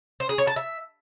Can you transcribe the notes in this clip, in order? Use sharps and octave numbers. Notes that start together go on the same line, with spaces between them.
C5
G#4
C#5
A5
E5